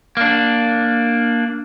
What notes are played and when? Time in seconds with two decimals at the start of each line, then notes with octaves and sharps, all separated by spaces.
0.17 A#3 D4